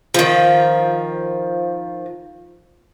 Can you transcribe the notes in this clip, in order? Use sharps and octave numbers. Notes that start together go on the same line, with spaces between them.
D#3 F3